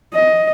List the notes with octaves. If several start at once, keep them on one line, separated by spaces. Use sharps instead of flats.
D#5